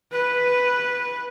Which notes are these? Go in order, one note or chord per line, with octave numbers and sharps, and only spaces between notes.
B4